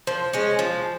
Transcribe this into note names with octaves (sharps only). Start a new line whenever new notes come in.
F3 C5
G#3 C#4
F3